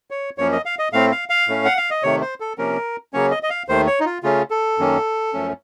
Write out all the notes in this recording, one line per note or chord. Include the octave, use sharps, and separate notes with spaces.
C#5
F#2 F3 A#3 C#4 C#5
D#5
F5
D#5
A2 A3 C4 F5
F5
F5
A2 A3 C#4
F#5
F5
D#5
C3 D#3 A3 C#5
C5
A4
C3 F3 A#3 C#4 A#4
C#3 F#3 A#3 C#4 C#5
D#5
D#5
F5
D#2 D#3 A3 C5
C#5
D#4
F4
C#3 A3 C#4 F4
A4
F#2 D#3 A#3 C#4
F#2 F3 A3 C#4